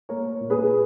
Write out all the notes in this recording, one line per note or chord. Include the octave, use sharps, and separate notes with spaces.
A#3 A#4 C#5
A#2
G#4 B4